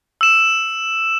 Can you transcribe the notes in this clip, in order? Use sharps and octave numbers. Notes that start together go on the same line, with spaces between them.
E6 E7